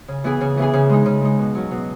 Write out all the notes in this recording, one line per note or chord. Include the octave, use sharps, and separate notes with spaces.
C#3
E3 B3 E4 G#4
C#3
E3 B3 E4 G#4
C#3
G#3 D#4
C#3
G#3 D#4
B2
F#3 C#4
B2